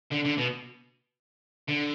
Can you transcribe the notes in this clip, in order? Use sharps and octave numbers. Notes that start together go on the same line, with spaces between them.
D3
D3
B2
D3